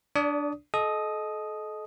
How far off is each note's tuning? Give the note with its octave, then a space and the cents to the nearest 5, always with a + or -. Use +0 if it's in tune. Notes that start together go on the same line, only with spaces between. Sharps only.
D4 +0 D5 -30 D#6 +0
A4 -35 D#5 +0 D#6 +0